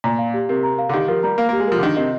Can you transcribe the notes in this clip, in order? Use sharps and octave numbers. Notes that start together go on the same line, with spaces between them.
A#2 A#5
F5
G4
C3 A#4
A#5
F5
D3
D#3 G4
F3 A#4
G3 A#5
A#3 F5
A#3
G4
G#3
F3 A#4
D3
D#3 D4
C3 D#5